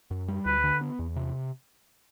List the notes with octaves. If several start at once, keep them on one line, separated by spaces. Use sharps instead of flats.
F#2
G3
D2 B4
D3
B3
E2
C3